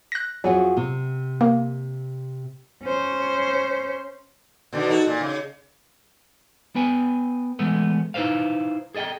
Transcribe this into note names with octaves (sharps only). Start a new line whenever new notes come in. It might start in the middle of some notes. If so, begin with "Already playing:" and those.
F#6 A#6
F2 F#3 F#4 G#4
C3
A#3
C#4 C5
B2 D3 D#3
D#4 F#4 A4
A#2
C#3
B3 B4 G5 G#5
E3 G#3 A3 B3
D#4 E4 G#4 B4 C5 F5
G#4 A4 D#5 E5 G5